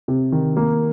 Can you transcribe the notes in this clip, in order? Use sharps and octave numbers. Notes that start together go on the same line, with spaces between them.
C3
D#3
A#3